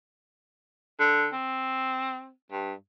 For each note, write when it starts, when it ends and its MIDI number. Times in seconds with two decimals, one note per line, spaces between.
0.99 1.28 50
1.33 2.31 60
2.52 2.73 43